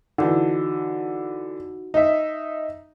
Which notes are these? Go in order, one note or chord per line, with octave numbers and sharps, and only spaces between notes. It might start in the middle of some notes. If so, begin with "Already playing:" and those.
D3 E3 D#4 F#4
D#4 E5